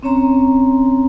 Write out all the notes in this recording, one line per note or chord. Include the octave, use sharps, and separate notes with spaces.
C4 C#4 C#5 A#5 C6